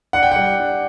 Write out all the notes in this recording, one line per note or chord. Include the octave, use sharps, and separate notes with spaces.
D4 F#5
G5
G3 F#5
D4